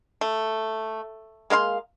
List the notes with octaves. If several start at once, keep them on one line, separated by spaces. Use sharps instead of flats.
A3
G#3 A#3 F5 C6